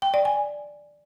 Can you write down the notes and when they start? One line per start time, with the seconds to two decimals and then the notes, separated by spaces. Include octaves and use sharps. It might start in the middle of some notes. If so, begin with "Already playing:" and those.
0.02 G5
0.14 D5
0.25 G#5